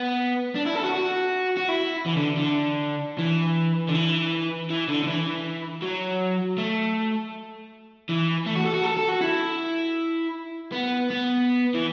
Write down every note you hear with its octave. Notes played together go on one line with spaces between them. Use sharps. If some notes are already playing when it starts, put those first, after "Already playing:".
Already playing: B3
D4
E4
A4
F#4
F#4
F#4
E4
E3
D3
D3
E3
D3
E3
E3
D3
D3
E3
F#3
A3
E3
A3
F#4
A4
F#4
A4
A4
F#4
E4
B3
B3
E3